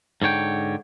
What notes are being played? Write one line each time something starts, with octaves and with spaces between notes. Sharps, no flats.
G#2 D3 C#5 G5